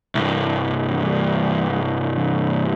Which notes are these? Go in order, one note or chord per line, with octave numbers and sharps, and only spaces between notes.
C2 G2